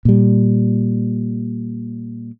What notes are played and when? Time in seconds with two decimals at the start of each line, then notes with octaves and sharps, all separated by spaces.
0.05 A#2 G3